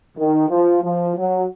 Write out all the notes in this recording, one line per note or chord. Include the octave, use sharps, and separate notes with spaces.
D#3
F3
F3
F#3